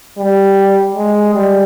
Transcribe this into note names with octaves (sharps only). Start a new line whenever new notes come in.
G3
G#3
G3